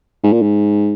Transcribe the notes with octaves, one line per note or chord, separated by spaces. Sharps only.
G#2
A#2
G#2